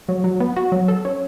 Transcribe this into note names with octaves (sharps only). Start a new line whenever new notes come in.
F#3
F#3
B3
F#4
F#3
A4
C#4